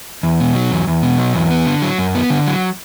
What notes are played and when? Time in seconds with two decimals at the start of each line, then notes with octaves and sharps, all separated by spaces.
0.23 E2
0.40 B2
0.55 F#3
0.71 E2
0.87 E2
1.03 B2
1.19 F#3
1.35 E2
1.51 B3
1.66 D3
1.82 F#3
1.98 F#2
2.15 B3
2.30 D3
2.46 F#3